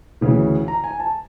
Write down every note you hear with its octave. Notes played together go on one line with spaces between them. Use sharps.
D2 C#3 E3
A#5
G#5
A5